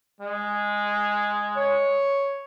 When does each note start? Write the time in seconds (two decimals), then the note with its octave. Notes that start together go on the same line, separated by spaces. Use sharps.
0.21 G#3
1.57 C#5